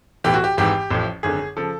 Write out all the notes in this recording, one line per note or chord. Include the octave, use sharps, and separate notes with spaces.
B1 A2 E3 G4
F#4
G4
G#1 G#2 E3 G4
A1 A2 F3
G#1 F#2 D3 G#4
C#3 F3 A4